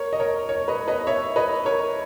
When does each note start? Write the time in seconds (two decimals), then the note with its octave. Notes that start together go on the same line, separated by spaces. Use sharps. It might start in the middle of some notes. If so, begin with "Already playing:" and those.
Already playing: A#4 C#5
0.13 D#5
0.20 A#4 C#5
0.49 A#4 C#5
0.68 B4 D#5
0.88 B4 D#5
1.07 C#5 E5
1.36 B4 D#5
1.65 A#4 C#5